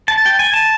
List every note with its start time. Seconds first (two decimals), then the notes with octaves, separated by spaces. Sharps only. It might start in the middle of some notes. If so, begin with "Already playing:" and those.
0.08 A5
0.26 G5
0.39 G#5
0.53 A5